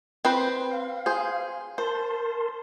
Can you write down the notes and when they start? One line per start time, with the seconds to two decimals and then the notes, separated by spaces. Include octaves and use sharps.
0.25 C4 B4 C5
0.71 F5
1.06 G#4 C5
1.78 A#4 C5 A5 C6